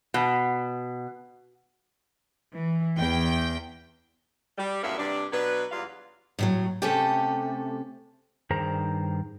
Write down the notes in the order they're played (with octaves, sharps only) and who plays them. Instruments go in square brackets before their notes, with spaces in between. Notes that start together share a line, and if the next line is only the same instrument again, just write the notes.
[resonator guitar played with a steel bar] B2
[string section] E3
E2 G5
[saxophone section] G3
F#2 A2 A#3 B3 C#4 E5
G2 C3 G3 D4
B2 F#3 D4 B4
E2 F#3 G3 F4 F5
[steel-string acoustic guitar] A2 F3 F#3
[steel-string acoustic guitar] C3 A4 [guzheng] A3 C#4 G4
[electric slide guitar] G2 D#3 G#4 A#4 C5 A#5